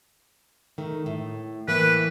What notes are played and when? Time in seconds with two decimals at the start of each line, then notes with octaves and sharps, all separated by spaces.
0.78 D#3 A3
1.06 A2
1.68 A2 E3 A#3 B4